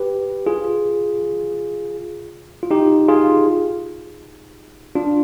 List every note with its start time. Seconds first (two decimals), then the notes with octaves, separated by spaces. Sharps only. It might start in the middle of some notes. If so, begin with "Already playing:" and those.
Already playing: G4 B4
0.47 F4 G#4
2.63 F4
2.71 D#4 G4
3.08 F4 G#4
4.95 D4 F4